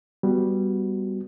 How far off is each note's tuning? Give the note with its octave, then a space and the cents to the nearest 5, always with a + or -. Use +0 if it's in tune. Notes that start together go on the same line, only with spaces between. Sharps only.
G3 +0 B3 +0 F#4 +0